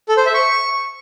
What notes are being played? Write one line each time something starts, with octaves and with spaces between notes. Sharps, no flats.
A4
C5
E5
C#6